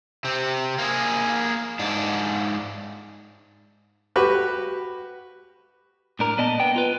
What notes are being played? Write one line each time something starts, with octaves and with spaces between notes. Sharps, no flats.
C3 C4
A#3 G#4
G#2 D4
F#4 G4 B4
A2 D4 A#4
A#2 B3 D5 D#5 A5
B3 G5
F4 B4